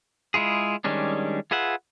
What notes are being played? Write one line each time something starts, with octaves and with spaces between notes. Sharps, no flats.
G#3 E4 F4 G#4
D#3 G3 G#3 C#4 D4
F4 G#4 B4 E5 F#5